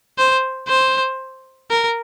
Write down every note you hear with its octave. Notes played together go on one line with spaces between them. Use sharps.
C5
C5
A#4